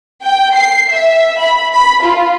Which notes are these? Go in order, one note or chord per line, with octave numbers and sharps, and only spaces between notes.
G5
C7
E5
B5
B5
F4